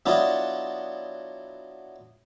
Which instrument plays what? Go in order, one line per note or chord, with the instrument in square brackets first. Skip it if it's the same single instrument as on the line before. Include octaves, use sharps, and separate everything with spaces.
[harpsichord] F#3 B3 D4 E4 F4 D#5